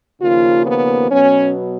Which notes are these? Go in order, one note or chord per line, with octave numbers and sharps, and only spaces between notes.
D#2 C#3 F3 A#3 F4
B3
B2 F#3 B3 C#4